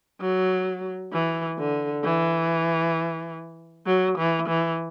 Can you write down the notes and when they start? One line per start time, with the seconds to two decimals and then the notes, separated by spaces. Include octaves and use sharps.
0.21 F#3
1.13 E3
1.58 D3
2.04 E3
3.86 F#3
4.18 E3
4.49 E3